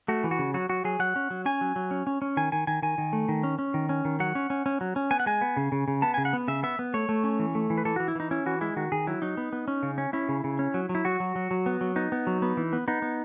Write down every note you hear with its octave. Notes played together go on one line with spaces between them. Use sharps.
A3 F#4
E3
F#4
C#3
F#3 F#4
F#3 F#4
F#3 G#4
F#3 F#5
C#4
F#3
C#4 G#5
F#3
F#3
C#4
C#4
C#4
D#3 G#5
D#3 G#5
D#3 G#5
D#3 G#5
D#3
A3
D#3
C#4
C#4
D#3
C#4
D#3
F#3 F#5
C#4
C#4
C#4
F#3
C#4
B3 G#5
F#5
G#3 G#5
B3
C#3
C#3
C#3
B3 A5
C#3 G#5
F#5
B3
C#3 E5
B3 E5
B3
A3 C#5
A3
C#4
E3
A3
E3
B4
E3 A4
E3 F#4
E4
E3 D#4
C#4 E4
E3 F#4
G#3 E4
D#3 F#4
D#3 G#4
F#3 E4
F#3 D#4
B3
B3
C#4
C#3
C#4
C#4 E4
C#3
C#3
C#4
F#3
F#3
E4
F#3 F#4
F#3
F#3
F#3
B3
F#3
B3 D#4
B3
F#3
B3
E3
B3
B3 D#4
B3